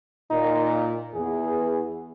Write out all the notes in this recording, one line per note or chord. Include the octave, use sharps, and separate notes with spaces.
A#2 D#4
E2 G#4